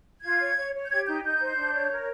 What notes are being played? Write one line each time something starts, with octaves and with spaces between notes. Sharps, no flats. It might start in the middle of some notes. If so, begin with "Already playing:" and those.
F4 G#6
C#5
C#5
C#5
G6
G4 G#6
D#4 G6
D#4 G6
C5
D4
C#5
A#4